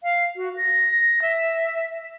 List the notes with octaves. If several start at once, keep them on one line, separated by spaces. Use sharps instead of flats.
F5
F#4
A#6
E5